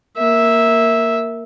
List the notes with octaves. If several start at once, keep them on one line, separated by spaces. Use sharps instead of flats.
A#3 E5